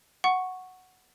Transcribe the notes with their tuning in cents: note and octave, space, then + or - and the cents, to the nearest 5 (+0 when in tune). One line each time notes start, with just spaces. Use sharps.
F#5 +0 C#6 -5